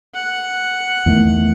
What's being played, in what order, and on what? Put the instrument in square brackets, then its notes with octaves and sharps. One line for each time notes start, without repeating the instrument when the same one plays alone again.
[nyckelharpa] F#5
[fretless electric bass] E2 D#3 A3